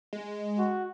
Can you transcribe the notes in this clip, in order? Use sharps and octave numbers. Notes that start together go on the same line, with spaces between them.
G#3
F#4